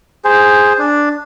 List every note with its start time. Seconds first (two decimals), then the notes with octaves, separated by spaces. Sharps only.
0.25 G#4 C5
0.79 D4